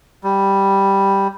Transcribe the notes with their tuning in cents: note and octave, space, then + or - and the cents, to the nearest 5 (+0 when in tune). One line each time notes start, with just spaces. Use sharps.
G3 +0